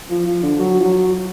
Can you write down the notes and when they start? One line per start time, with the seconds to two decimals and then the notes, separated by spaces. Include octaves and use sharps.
0.10 F3
0.27 F3
0.43 D3
0.59 F#3
0.79 F3
0.84 F#3